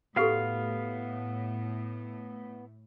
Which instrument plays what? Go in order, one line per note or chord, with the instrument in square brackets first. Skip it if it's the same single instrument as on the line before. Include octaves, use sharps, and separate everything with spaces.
[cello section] A2 [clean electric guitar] B3 F5 [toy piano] F#4 G4 A4